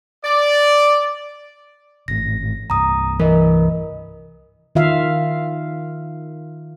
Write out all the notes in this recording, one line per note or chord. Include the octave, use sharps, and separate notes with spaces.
D5
G#1 A2 A#6
C2 G2 A#5 D#6
E3 A#4 D#5
D#3 F4 E5 F5